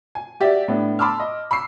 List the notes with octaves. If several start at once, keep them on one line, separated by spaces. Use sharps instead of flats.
G#5
F#4 G4 D5 E5
A2 B3 D4
A5 B5 C6 D6 E6 F6
D#5
B5 C#6 E6 C7